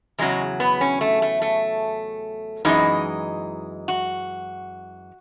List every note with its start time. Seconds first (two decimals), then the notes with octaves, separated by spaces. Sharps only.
0.18 E2 C#3 F#3 G#3
0.60 B3
0.81 C#4
1.01 A3
1.22 A3
1.42 A3
2.65 F#2 E3 G#3 D#4
3.88 F#4